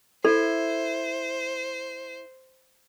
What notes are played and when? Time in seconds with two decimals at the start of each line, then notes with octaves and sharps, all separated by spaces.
0.25 E4 A4 C5